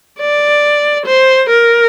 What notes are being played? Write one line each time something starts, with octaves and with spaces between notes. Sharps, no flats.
D5
C5
A#4